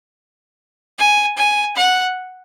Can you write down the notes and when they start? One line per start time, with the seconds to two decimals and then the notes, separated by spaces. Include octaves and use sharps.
0.99 G#5
1.37 G#5
1.76 F#5